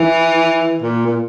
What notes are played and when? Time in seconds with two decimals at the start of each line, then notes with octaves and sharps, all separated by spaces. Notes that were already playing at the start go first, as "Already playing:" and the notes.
Already playing: E3
0.82 A#2
1.06 A#2